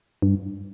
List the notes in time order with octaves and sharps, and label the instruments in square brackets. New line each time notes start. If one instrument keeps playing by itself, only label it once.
[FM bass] G2